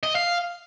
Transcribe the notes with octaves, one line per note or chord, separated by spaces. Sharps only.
D#5
F5